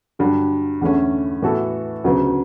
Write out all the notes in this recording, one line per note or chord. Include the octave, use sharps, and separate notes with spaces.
G2 D3 F#3
E2 D3 A3 C#4
A2 E3 B3 F#4 A4
D2 C#3 F#3 B3